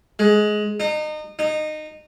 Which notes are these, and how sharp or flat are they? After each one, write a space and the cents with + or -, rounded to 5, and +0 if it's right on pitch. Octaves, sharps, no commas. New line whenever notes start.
G#3 +15
D#4 -30
D#4 -20